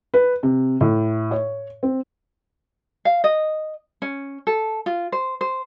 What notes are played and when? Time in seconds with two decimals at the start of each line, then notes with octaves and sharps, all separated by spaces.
0.14 B4
0.43 C3
0.81 A2
1.31 C#5
1.83 C4
3.05 F5
3.24 D#5
4.02 C#4
4.47 A4
4.86 F4
5.12 C5
5.41 C5